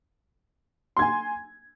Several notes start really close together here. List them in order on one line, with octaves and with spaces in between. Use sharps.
C6 G#6 G#5